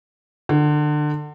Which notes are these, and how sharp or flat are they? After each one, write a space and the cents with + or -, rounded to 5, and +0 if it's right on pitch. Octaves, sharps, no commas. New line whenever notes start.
D3 +30